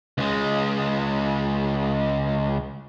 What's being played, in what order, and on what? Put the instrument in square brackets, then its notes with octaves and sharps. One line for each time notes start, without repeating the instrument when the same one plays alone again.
[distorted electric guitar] C#2 G#3